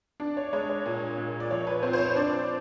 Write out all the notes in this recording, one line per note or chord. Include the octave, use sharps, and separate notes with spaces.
D4 D5
C#5
G#3 C#5
C#5
A#2
A#2
D5
F3 C#5
B4
C4 C5
C5
C#5
D4 D5